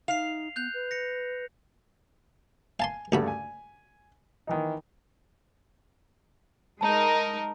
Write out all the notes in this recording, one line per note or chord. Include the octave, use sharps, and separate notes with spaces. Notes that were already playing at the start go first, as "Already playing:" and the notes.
D#4 F5 C7 F7
B3 F#6 G6 F7
B4
A#6 C#7
F5 G#5 A5 C6
D2 G2 C#3 A3 F#4 B5
G#5
D#3 E3 D#4
G#3 D#4 A#4 A5 A#5